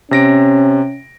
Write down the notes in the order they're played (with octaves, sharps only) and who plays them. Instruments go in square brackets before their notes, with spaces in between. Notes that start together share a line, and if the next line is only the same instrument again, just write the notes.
[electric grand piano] C3 A#6 D7 [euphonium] C#4